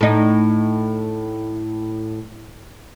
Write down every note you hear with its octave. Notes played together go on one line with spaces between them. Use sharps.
A2 D#4